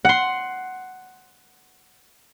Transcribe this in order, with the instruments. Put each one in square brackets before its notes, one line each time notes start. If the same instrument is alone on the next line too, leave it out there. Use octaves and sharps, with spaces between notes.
[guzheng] F#5 C6